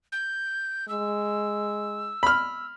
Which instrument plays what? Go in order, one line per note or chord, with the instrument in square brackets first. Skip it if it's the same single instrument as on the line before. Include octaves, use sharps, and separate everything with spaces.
[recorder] G6
[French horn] G#3 [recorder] E6
[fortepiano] B5 F6